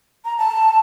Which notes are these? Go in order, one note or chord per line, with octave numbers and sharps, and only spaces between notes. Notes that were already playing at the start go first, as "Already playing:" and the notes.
A#5
A5